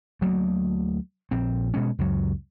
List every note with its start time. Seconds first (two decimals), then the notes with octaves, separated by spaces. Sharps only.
0.21 D2 F#3 A3 A#3
1.31 A#1 C4
1.74 B2 G#3 C#4
1.99 C#2 F#2 F#3